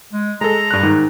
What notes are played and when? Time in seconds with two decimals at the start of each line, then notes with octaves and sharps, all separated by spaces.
0.13 G#3
0.41 G#3 A4 A#5
0.71 G2 F#6
0.83 G#2 D#3